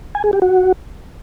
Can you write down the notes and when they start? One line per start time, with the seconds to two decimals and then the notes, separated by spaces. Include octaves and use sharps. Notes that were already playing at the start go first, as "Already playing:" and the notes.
0.15 G#5
0.24 G#4
0.33 G4
0.42 F#4